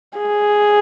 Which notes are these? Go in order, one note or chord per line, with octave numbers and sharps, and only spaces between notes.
G#4